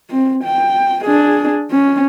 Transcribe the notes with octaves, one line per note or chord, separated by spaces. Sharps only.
C4
G5
D4 G#4
C#4